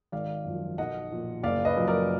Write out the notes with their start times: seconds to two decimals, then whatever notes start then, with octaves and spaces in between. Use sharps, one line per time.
0.12 G#1 D5 F5
0.45 F#2 F3
0.78 B1 D#5 F#5
1.11 A#2 F3
1.43 F#1 D5 F5
1.65 B4 D#5
1.77 F#2 F3
1.87 A#4 D5